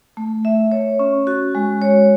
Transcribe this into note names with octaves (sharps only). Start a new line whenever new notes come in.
A3
E5
C#5
C#4
F#4
G#3
C#5